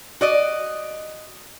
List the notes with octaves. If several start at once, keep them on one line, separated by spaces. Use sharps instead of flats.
F#4 D5 D#5